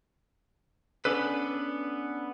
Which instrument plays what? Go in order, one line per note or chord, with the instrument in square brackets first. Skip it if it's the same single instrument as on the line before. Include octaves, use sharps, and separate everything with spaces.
[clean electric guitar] B3 C#4 D4 A4 B4